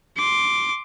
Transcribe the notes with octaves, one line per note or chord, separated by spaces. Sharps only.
C6 D6